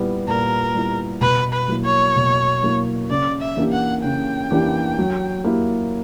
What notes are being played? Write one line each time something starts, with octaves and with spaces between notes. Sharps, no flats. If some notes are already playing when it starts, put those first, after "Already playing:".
Already playing: A#2 G3 B3 E4
A#2 A#4
G3 B3 E4
B2 B4
B4
F#3 A#3 E4
C#5
B2
F#3 A#3 E4
C#3 D5
E5
E3 A#3 D4 G4
F#5
C#3 G5
E3 A#3 D4 G4
F#3
A#3 E4 G4